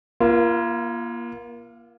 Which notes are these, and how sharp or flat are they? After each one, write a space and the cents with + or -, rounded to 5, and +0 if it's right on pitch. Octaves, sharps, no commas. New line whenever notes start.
A#3 +30 F4 -30